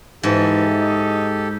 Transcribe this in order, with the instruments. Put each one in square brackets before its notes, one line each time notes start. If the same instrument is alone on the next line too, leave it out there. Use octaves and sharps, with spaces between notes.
[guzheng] G#2 [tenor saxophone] E3 [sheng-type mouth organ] G4 A4
[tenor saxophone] D#4